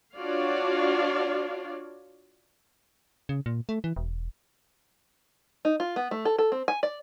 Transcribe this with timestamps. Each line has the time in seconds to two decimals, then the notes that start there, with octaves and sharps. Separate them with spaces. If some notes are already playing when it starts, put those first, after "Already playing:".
0.15 D4 F4 F#4 C#5 D5 F5
3.29 C#3
3.46 A#2
3.69 A3
3.84 E3
3.96 E1
5.65 D#4
5.80 F4
5.96 B3
6.11 A3
6.25 A4
6.39 A4
6.52 C4
6.68 G#5
6.83 D5